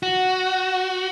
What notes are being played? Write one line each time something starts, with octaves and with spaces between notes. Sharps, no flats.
F#4